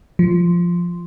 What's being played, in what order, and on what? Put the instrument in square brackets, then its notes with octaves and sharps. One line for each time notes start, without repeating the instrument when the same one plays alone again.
[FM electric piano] F3